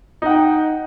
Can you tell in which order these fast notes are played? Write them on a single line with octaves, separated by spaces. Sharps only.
D#4 F#5 G5